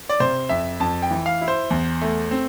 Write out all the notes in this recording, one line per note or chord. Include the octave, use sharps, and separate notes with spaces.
D5
C3 C5
F2 E5
F2 A5
G5
E3
F5
E4
C5
E2
A3
C4